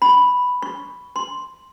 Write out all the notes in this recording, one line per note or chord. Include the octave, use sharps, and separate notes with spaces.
B5
C#6
C6